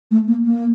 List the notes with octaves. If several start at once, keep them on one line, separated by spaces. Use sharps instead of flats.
A3
A#3
A#3